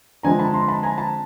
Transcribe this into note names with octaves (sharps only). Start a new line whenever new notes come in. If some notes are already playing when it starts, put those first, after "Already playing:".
D3 F3 G#3 C4 G#5 A#5
A5 B5
A#5 C6
A5 B5
G#5 A#5
A5 B5